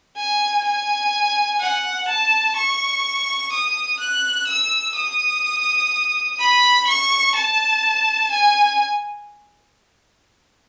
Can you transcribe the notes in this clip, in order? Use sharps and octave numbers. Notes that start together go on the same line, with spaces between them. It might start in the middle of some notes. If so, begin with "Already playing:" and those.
G#5
G#5
F#5
A5
C#6
D#6
F#6
E6
D#6
B5
C#6
A5
G#5